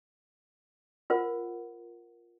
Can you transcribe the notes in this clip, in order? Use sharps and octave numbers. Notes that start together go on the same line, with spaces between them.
F4 A#4 C5 F#5